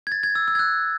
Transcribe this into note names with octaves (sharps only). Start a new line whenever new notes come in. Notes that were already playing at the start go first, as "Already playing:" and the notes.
G#6
A6
G#6
E6
E6
G#6
F#6